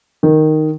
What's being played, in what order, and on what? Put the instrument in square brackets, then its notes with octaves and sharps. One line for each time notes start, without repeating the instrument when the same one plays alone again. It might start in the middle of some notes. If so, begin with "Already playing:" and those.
[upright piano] D#3